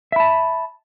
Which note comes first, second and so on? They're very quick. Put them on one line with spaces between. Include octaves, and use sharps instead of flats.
E5 B5 A5